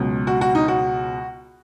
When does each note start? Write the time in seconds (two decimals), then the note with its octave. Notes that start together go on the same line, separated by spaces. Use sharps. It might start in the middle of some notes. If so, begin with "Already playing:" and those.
Already playing: C#2 B2 F#3
0.27 F#4
0.41 F#4
0.55 D#4
0.68 F#4